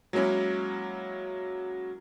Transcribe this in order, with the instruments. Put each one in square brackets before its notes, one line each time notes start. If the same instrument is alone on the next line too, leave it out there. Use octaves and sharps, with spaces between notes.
[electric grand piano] F#3 G#3 A#3 C#4 E4